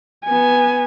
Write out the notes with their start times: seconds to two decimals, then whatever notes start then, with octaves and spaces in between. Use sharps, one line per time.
0.24 B3 G#5